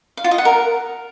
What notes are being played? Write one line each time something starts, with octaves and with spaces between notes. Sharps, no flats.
F5
F4
D#5
F#5
A#4